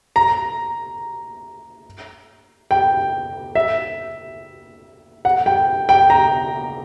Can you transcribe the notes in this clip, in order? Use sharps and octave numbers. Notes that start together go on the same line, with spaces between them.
A#5
G5
E5
F#5
G5
G5
A#5